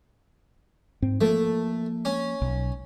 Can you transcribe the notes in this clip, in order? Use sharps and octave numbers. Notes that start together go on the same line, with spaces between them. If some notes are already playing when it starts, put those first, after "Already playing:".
G#2 C4
F3 A3 A#3
C#4
B1